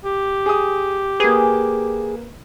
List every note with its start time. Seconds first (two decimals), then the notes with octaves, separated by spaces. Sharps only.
0.04 G4
0.46 G#4 D#6
1.20 A#3 G#4 B4